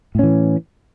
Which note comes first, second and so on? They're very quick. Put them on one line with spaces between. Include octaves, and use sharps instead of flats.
A2 C#4 E3